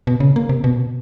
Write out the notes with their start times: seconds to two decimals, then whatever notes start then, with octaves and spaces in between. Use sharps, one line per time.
0.07 B2
0.20 C#3
0.36 A#3
0.49 C3
0.64 B2